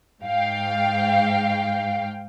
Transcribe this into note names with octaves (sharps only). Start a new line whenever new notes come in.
G#2 F5 G5